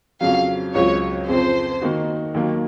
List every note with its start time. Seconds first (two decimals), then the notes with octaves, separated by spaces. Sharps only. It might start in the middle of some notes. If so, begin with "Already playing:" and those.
0.21 F2 C#3 F#3 F5
0.74 C#2 C#3 F#3 C4 F4 C#5
1.27 F2 C#3 F3 C4 C5
1.82 D#3 A#3 D#4 F#4
2.34 D#2 D#3 F#3 A#3